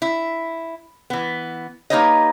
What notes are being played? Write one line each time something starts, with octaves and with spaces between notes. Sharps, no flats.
E4
E3 B3
A#3 D#4 G4 B4 C#5 D#5